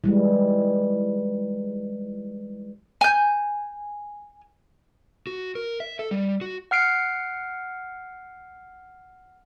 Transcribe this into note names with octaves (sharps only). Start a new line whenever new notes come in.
E3 G3 G#3
G#5 G6
F#4
A#4
E5
A4
G3
F#4
F#5 F6 C7 D7